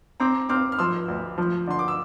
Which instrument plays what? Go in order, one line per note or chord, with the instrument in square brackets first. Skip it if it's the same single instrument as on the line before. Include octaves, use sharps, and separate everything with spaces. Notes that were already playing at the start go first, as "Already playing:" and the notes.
[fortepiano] C4 [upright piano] A#5 D6
[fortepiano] C4 [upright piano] D6 F6
[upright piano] F6
[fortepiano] F3 [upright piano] C6 E6
[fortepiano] D2
F3
[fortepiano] D3 [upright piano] C6
[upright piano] D6
E6